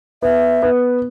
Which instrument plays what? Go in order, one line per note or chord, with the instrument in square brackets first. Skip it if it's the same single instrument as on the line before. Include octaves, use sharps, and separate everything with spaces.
[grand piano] B3 [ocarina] E5
[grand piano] B3